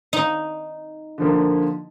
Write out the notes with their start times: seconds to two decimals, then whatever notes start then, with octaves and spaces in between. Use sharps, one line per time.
0.13 D#4
1.18 D3 F3 A#3